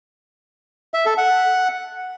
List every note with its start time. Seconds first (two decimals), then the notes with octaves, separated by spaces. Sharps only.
0.94 E5
1.06 A4
1.18 F#5